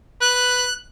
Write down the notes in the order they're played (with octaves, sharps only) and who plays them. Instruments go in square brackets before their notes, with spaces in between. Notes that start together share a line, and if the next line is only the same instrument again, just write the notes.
[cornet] B4 [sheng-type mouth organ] F#6